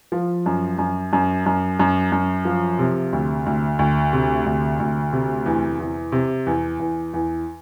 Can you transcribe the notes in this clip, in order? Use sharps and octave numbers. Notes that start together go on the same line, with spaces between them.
F3
F#2
F#2
F#2
F#2
F#2
F#2
F3
C3
D2
D2
D2
C3
D2
D2
C3
E2
E2
C3
E2
E2
E2